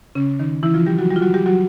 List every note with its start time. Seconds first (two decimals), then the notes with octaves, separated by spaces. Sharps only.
0.15 C#3 C#4
0.40 D#3 D#4
0.63 E3 E4
0.74 F3 F4
0.86 G3 G4
0.98 F#3 F#4
1.10 G3 G4
1.16 F4
1.22 F#3 F#4
1.34 G3 G4
1.46 F#3 F#4